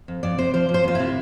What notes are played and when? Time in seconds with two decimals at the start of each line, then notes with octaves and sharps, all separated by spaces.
0.08 F2
0.23 F2 D5
0.38 C3 C5
0.54 F3 C5
0.69 F3
0.74 C5
0.84 F2 F4
0.95 C3 E4